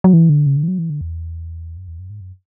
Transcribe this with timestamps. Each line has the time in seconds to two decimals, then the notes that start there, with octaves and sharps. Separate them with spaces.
0.04 F#3
0.13 E3
0.29 D3
0.46 C#3
0.57 D3
0.63 E3
0.68 F#3
0.79 E3
0.90 D3
1.01 E2
1.77 F#2
1.88 E2
1.99 F#2
2.10 G#2
2.21 F#2